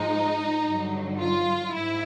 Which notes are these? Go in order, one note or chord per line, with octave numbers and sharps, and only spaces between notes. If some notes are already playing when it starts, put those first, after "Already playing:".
Already playing: G#2 F3 G#3 D#4
G2 D3 F#3
F4
G#2 E4